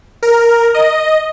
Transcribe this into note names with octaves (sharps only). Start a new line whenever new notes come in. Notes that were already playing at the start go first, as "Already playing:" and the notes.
A#4
D#5